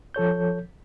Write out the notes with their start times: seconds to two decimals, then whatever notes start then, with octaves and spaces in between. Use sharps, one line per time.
0.14 F3 A4 C#5 G6